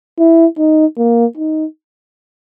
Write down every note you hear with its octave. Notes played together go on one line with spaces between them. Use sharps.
E4
D#4
A#3
D#4